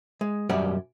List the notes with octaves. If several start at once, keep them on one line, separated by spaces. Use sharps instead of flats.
G#3
B1 F#2 G3 C#4 D5 F#5